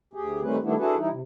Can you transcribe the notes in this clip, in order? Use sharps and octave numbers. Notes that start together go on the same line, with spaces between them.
D2 G4 G#4
D#3 G3 A3 C4 C#4 B4
D#3 G3 A3 B3 D4 E4
D4 E4 F#4 G#4 A4 B4
E3 G3 D#4 E4
C3